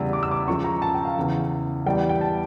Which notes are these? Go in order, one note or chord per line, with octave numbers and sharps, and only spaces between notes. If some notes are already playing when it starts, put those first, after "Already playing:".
Already playing: E2 C#3 E3 G3 E6
D6
E6
D6
C#2 C#3 F3 C#6
A#5
A5
G5
F5
E2 C#3 E3
E2 E3 G3 G5
G5
A5